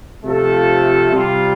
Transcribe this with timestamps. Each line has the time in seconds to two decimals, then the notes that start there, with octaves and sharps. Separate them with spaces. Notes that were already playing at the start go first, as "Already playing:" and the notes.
0.25 C3 F3 A3 F4 A4
1.11 C3 G3 F4